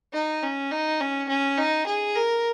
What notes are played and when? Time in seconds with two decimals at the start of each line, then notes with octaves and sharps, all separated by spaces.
0.13 D#4
0.43 C#4
0.71 D#4
1.00 C#4
1.28 C#4
1.58 D#4
1.86 G#4
2.15 A#4